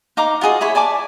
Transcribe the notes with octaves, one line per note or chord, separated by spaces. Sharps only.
D#4 F5 A#5 D6
F4 F#4 G#4 D#5
E4 G#4 C#5 B5
D5 G#5 A5 D6